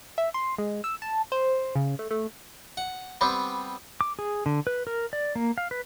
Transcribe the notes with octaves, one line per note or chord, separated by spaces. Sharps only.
E5
C6
G#3
E6
A5
C5
C#3
A3
A3
F#5
G3 B3 C4
D6
G#4
D3
B4
A#4
D5
A#3
F5
B4